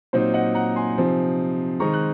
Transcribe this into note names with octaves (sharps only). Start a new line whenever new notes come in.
A#2 F#3 C4 D#4 C5
D#5 F#5
F#5 A#5
G#5 C6
C3 F3 C4 D#4
D#3 G#3 C4 D#4 A#5 C#6
F#6